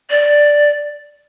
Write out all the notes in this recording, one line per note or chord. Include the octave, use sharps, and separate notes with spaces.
D5